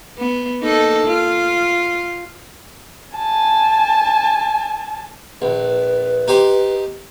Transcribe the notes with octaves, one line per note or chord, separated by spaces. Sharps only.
B3
A#3 D#4 A4
F4
G#5 A5
A#1 B4
D#4 G4 C5